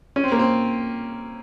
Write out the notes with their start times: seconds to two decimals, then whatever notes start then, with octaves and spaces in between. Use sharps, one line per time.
0.16 C#4
0.24 C4
0.32 A#3
0.39 C4